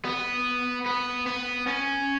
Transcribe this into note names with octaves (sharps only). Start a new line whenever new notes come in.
B3
B3
B3
C#4